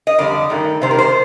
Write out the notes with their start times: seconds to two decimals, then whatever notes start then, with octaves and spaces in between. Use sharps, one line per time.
0.07 D#5
0.18 F2 D3 G3 D5
0.50 G2 D#3 A3
0.82 C3 D#3 G3 C5
0.91 A#4
0.99 C5